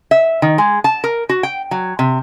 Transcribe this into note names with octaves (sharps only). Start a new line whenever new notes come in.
E5
D#3
G#3
A5
A#4
F#4
G5
F#3
C3